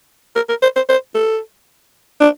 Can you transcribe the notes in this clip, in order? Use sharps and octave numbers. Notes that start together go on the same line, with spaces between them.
A#4
A#4
C5
C5
C5
A4
D4